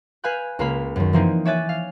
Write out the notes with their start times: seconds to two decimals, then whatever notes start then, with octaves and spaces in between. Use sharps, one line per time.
0.24 B4 F5 G#5 B5 F#6 G6
0.59 C#2 A#3 F4 F5 B5
0.96 F#2 D#3
1.13 E3 F3 A#3 C4 D#4
1.45 C#5 D5 E5 G#5 F#6 A6
1.69 F5